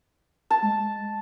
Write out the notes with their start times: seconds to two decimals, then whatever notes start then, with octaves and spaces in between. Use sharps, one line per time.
0.51 A5
0.62 G#3